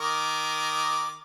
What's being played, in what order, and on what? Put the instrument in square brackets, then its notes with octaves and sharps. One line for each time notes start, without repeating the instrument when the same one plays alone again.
[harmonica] D#3 A#4 D6